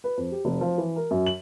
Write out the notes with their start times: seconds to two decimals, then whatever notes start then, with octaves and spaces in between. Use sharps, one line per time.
0.04 B4
0.17 F2
0.32 G4
0.45 F1
0.61 F3
0.78 E3
0.96 A#4
1.11 F#2
1.27 F#7